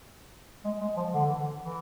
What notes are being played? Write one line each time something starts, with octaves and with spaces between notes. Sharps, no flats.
G#3
G#3
F3
D3
E3
D3
E3